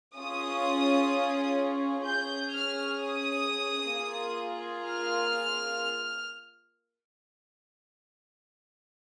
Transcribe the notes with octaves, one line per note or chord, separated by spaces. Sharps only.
C#4 F4 G#4 D#6
C#4 G#4 G6
F6
D#6
A#3 F4 G#4
F6